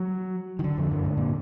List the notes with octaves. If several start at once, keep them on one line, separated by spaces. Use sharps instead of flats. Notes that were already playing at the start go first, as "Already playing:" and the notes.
Already playing: F#3
D#3
D3
F2
F#2
G#2
A#2